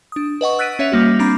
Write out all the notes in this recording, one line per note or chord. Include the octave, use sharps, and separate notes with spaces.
D4 D#6
B4 D#5 F#5 C#6
E6 F#6 A6 B6 D7 D#7
C#4 C#5 E5 B6 D#7 F7
G3 A#3 F#4
C4 D4 A#5 B5 D6